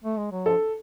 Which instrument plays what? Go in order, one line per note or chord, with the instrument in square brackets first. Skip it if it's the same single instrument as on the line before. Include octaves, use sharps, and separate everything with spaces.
[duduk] A3
G#3
F#3
[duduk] F3 [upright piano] A4